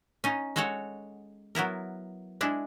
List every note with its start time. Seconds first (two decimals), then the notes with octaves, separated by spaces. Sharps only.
0.24 C#4 D#4
0.56 G#3 F#4 A4 C#5 F#5
1.55 F#3 B3 E4 A#4
2.41 G#3 D4 E4